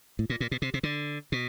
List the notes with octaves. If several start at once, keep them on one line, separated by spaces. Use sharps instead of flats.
A2
A#2
A#2
B2
C3
C3
D3
B2